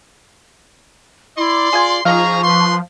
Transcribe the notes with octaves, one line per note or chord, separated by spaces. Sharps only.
E4 D5 C6
F4 G#4 G#5
F3 D#4 G#4 D#5 F5 A#5 C#6
B4 C6